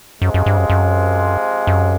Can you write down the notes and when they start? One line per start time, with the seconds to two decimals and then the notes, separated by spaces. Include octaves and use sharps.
0.21 F#2 C3 F3 G#3
0.34 F#2
0.46 G2
0.57 F#2
0.70 F#2
1.67 F#2